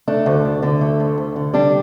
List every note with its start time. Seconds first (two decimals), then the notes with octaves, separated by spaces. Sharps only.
0.08 A3 D4
0.26 D2
0.45 D2
0.62 D3
0.81 A3
1.00 D2
1.18 D2
1.36 D3
1.54 G3 D4